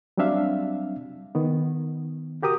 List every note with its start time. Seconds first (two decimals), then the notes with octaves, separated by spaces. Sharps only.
0.17 F#3 G3 C4 D4 E5 F5
1.35 D#3 B3
2.42 F#4 G4 A#4 D#6